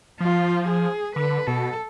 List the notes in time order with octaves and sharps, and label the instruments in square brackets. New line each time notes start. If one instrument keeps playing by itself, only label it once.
[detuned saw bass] F3 [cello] F4
[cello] G#4
[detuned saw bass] D3 [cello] B4
[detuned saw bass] B2 [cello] A4